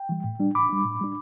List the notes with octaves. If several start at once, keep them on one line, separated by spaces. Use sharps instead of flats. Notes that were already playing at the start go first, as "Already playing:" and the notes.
Already playing: G5
E3 G3
A2
G3 D4
A2 B5 D6
G3 D4
A2
G3 D4